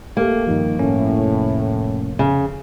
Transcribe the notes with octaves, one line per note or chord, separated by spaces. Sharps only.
A3 A#3 G4
G2 D#3 F3
A2 C#4
F1
C#3